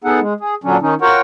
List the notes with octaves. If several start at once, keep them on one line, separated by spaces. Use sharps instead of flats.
B3 D#4 G#4 A4 F#5
G#3
G#4
A#2 D3 F#3 C#4 D4
D#3 C#4 D#4
F4 F#4 A#4 C#5 F#5 G5